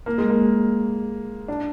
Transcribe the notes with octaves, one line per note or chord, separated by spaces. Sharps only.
A#3
G#3
A#3
D4